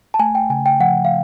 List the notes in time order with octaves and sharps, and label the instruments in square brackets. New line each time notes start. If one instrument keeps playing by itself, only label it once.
[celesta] A5
[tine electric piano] A3 [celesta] G#5
[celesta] G5
[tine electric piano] C#3 [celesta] G#5
[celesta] G5
[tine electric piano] F3 [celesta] F#5
[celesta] F5